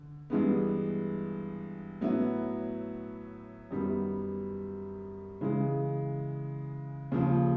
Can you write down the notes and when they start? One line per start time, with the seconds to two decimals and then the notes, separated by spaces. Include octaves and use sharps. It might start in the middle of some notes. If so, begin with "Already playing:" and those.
Already playing: D3
0.30 G2 E3 G#3 B3
2.01 A2 F#3 B3 E4
3.71 F#2 D#3 G3 B3
5.41 C#3 E3 G#3
7.12 D#2 C#3 F3